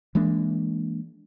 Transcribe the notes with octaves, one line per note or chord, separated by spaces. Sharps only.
E3 G#3 A#3 D4